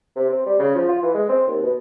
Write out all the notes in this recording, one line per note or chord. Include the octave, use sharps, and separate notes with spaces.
C3
C4
G3
C#3
F3
F4
E3
G#3
C4
D#2
B2